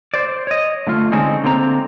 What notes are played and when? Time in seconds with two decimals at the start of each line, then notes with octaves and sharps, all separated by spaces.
0.14 C5 D5
0.47 C#5 D#5
0.87 D3 A3 F4
1.12 D3 G#3 C4 C#4 D#4
1.44 D3 A#3 C4 C5 A#5